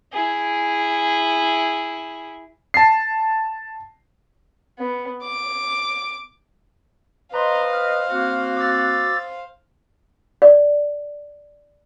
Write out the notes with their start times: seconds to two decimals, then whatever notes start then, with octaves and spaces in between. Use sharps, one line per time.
0.12 E4 G#4
2.74 A5 C7
4.79 B3
5.23 D6
7.34 B4 C5 D#5 F5 A#5 C6
7.73 F6
8.10 A#3 C4 F#4
8.57 D6 E6 A6
10.42 D5